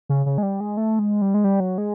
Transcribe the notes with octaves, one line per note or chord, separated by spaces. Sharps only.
C#3
C#3
G#3
G3
G#3
A3
G#3
G3
G#3
G3
F#3
G#3